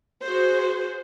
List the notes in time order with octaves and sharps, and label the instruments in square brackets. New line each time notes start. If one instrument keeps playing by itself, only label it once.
[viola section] F#4 G#4 C5